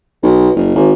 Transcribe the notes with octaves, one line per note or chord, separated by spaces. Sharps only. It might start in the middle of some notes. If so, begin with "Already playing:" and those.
B1
F#1
G#1